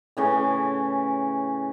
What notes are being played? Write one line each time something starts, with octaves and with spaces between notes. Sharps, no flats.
A2 C#3 E3 C#5